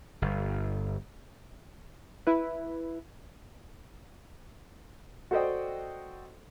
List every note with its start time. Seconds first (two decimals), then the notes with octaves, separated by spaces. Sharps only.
0.22 G1
2.27 E4 B4
5.31 F#4 A4 C5 D5 D#5 G5